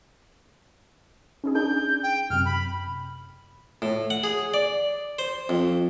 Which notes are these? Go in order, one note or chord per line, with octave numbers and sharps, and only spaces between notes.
C#4 D#4 G#4
D4 D#4 G#4 G6
G5
F#2 C3 F6
B5
A2
F#5
G#4
D5
C5
F2